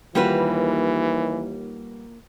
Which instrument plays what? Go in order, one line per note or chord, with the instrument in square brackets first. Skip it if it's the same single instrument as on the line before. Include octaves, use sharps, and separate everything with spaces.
[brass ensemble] D#2 [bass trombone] E3 [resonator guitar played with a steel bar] G3 F#4 B4 [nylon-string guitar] A#3 F4 C5